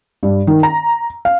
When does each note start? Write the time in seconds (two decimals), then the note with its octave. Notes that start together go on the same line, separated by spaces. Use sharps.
0.23 G2
0.47 D#3
0.63 A#5
1.25 F5